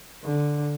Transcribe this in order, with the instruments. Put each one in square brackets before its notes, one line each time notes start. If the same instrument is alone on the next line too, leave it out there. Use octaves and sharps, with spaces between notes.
[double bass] D3